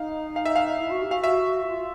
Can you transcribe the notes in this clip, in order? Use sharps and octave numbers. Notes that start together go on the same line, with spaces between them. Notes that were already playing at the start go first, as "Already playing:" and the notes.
Already playing: D#4 F5
F5
E5
F5
E4
F#4
G4
F#4 F5
E5
F4